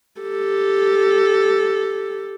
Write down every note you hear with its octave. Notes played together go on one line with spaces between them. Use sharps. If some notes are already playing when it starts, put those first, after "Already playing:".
G4 A4